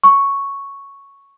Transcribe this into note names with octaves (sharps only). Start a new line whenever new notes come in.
C#6